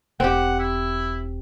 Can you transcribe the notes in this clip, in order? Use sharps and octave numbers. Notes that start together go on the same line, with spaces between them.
E1 C4 G4 F#5
E4